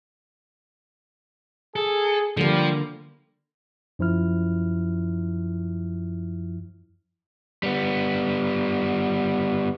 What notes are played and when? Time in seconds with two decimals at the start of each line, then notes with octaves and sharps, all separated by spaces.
1.76 G#4 A4
2.37 D3 F3 G3 A#3
3.99 F#2 F3 E4 F6
7.63 G3 B3